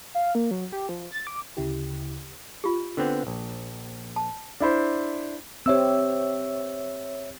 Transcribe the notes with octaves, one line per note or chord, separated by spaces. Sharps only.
F5
A#3
F#3
G4
F3
A6
D6
D2 C#3 E4 G4
F4 G4
D3 B3 C4
A#1
A5
D4 E4 C5
C4 G4 C#5 E5 E6